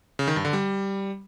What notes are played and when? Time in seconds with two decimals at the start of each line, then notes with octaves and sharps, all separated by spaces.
0.19 C#3
0.28 D#3
0.36 G2
0.45 D3
0.53 G3